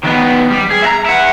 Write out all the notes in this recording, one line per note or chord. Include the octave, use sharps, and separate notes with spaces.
D#3 B3
G3
G#4
E5 A#5
E4 F#5